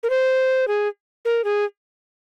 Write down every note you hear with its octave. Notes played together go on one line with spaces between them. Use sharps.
A#4
C5
G#4
A#4
G#4